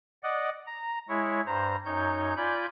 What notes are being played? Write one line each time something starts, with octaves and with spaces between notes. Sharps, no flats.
D5 D#5 F#5
A#5
G#3 E4 C#5
G2 C5 A#5
F#2 D#4 C#5 G6
F4 D5 G#5 B5 G6